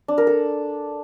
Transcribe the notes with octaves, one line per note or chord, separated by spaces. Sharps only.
D4
A#4
A4